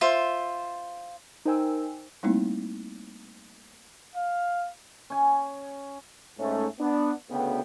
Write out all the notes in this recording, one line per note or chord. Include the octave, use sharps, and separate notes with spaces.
F4 C5 E5
D#4 A#4 C5 G5 G#5 E6
G3 A3 A#3 C4 D#4 E4
F5
C#4 G#5
G#2 A3 C#4
B3 D4
D2 C#3 B3 G5